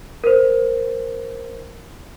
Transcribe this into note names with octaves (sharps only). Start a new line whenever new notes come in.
A#4 C5